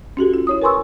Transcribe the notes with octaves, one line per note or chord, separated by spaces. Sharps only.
C#4 F#4 G4 A4
F4
E4 C#5 D#6
A#4 B4 G#5 C6 C#6 E6